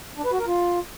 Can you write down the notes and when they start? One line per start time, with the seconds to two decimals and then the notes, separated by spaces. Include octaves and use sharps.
0.18 D4
0.25 B4
0.32 F#4
0.39 A#4
0.47 F4